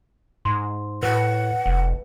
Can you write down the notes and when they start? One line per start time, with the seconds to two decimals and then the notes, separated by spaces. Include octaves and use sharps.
0.45 G#2 C6
1.03 A2 B4 F#5
1.66 F1